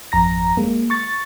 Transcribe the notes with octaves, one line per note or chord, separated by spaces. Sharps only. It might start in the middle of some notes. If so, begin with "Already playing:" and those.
G#1 F2 A#5 A#6
G#3 A#3
C#6 A6